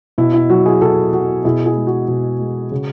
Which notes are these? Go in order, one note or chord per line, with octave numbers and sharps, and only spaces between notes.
B2 E4
E4
F#3 F#4
E4 G#4
B2 F#4 A4
F#3 F#4
B2 E4 G#4
E4 G#4
G#3
F#4
B2
G#3
C#3